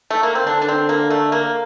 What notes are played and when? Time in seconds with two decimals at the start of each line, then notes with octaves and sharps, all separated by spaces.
0.10 A3
0.23 A#3
0.35 C4
0.46 D3 D4
0.62 D4
0.68 C4
0.89 A#3
1.10 A3
1.32 A#3